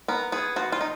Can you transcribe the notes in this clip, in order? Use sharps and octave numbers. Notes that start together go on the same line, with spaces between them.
B3 A#4
B3 G#4
F3 F#4
F4
D#4